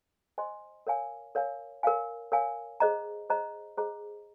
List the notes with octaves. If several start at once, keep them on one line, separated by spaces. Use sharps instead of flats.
C5 D#5 G#5 C6
A#4 C#5 F5 G#5
A#4 C#5 F5 G#5
A#4 C#5 F5 G#5
A#4 C#5 F5 G#5
G#4 C5 D#5 A#5
G#4 C5 D#5 A#5
G#4 C5 D#5 A#5